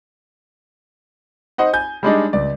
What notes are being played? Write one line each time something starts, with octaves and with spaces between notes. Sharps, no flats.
D#4 C5 D#5 F#5
G#5 G6
G3 G#3 D4 D#4
C#2 D5